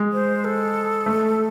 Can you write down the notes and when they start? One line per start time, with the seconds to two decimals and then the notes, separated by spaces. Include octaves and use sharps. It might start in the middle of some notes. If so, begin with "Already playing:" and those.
Already playing: G#3
0.13 C5
0.45 A4
1.06 A3